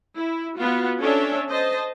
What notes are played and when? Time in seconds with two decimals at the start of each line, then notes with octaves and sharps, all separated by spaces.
0.17 E4
0.56 B3 F4 F#4
1.01 C#4 D4 A4 C#5 E5
1.49 C5 D#5 A5